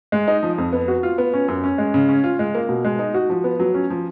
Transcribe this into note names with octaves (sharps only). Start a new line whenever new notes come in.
G#3
D#4
F3
F2
B3
F#4
F4
B3
C#4
F#2
C#4
G#3
C#3
C#4
F4
G#3
A#3
B2
G#3
D#4
F#4
F3
B3
F#3
C#4
F3